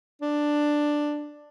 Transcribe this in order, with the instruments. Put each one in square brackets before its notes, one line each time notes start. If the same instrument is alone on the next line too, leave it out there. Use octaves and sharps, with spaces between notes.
[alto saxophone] D4